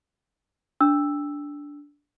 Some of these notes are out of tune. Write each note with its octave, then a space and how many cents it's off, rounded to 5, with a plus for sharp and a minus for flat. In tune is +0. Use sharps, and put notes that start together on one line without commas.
D4 -10 E6 +0